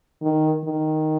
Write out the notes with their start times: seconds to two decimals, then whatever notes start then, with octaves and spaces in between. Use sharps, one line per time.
0.22 D#3
0.65 D#3